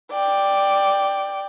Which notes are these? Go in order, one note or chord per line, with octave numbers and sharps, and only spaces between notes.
D5 G5